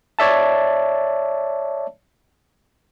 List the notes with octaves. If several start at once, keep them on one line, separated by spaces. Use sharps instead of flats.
C#5 D5 E5 A5